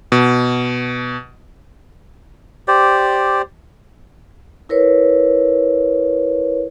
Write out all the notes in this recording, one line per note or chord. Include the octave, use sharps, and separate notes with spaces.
B2
G4 C5 D5
E4 A#4 B4 C#5